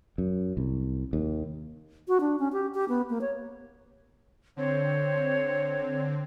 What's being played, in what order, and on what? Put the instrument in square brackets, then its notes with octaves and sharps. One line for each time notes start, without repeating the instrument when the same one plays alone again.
[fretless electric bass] F#2
C2
D#2
[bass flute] F#4
D4
C#4
G4
G4
B3
A#3
C#5
[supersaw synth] D3 C4 [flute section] C5 C#5